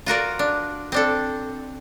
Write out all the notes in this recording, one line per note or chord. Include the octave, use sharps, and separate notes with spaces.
F4 F#4 A#4 D5
D4
C4 D4 A4